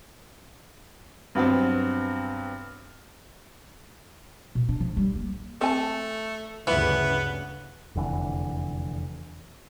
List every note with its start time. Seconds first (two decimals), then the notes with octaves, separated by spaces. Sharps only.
1.35 G2 F#3 B3 C4
4.55 B2
4.69 D4
4.81 F3
4.97 G3
5.15 A#3
5.61 A3 C4 G#5 A5
6.67 D2 G2 C#3 E3 B3 F4
7.95 F1 E2 D3 E3